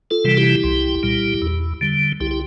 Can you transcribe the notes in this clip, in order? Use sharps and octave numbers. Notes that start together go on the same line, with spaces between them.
F4 A4
C3 E3 G3
E4 G4
C2
A#2 G3
E2
D3 G3
C2 E4 G4
G4